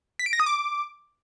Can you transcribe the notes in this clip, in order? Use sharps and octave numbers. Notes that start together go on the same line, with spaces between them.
B6
D7
A#6
D#6
D6